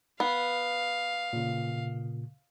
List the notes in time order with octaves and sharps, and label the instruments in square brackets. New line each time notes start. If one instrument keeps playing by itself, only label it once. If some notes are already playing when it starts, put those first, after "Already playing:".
[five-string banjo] B3 [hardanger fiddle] F5
[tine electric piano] A#2 C#3